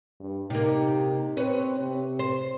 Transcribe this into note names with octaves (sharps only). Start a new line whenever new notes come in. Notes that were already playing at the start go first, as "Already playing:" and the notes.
G2
C3 A#3 D#4
C4 B4 C#5
C3
C5